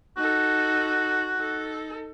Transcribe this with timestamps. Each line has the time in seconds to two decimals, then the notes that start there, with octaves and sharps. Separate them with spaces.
0.17 D#4 F#4 A4
1.36 D#4 A4